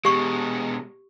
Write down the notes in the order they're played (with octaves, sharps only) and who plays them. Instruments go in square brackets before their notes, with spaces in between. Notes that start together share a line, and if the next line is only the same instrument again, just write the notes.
[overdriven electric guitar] B2 G#3 [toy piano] G4 C#6